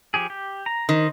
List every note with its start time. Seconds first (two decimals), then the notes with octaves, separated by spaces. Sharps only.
0.14 F3 G4 G#4
0.30 G4
0.66 A#5
0.89 D#3 C5 D#5